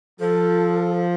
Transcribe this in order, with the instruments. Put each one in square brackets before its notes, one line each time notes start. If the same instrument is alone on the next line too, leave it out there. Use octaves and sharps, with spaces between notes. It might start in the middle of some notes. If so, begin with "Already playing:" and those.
[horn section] F3 [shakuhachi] A4